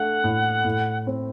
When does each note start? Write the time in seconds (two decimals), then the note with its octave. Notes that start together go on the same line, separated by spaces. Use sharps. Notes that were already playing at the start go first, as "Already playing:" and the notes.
Already playing: A3 D4 F#5
0.24 A2
0.65 A2
1.07 C4